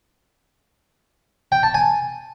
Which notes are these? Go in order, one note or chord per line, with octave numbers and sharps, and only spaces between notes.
G5
A5
G#5